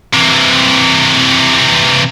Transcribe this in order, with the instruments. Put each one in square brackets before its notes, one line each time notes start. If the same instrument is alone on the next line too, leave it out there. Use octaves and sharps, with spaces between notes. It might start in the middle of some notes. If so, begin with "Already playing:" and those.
[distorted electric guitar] C3 E3